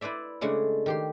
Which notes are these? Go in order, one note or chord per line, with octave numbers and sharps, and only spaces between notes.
E4 B4 C5 D5 E5
C#3 G#3 A3 D4 F#5
D#3 G4 C6